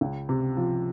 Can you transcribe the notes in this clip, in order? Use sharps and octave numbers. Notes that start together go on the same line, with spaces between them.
C#2
C3
F3